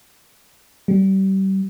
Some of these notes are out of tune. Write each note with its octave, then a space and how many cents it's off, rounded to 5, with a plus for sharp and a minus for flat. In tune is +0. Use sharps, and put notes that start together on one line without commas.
G3 -30